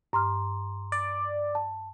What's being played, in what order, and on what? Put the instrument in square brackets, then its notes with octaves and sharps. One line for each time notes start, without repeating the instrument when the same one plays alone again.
[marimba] G2 F6 [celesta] A#5 C6 D6
[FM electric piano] D5
[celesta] A5